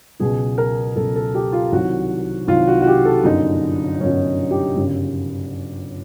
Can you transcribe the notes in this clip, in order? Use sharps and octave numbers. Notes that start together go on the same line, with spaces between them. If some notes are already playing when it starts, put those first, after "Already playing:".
C#2 B2 F#3 G#4
A#4
C#2 B2 F#3 A4
A4
G4
F4
C2 C3 D#3 F#3 F#4
C2 C3 D#3 F#3 F4
F#4
F#4
G4
A4
G1 F#2 D3 D#4
G1 F#2 D3 C#4
G4
G1 F#2 C#3 F#3